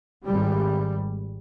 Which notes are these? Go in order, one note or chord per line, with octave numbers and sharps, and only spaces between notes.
G#1 G3